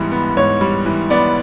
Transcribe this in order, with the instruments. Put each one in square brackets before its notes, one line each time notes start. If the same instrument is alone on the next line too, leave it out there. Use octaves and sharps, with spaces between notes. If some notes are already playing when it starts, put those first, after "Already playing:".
Already playing: [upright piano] G#2 E3 G3 B3
B3
G#2 C#5
G3
E3
B3 D5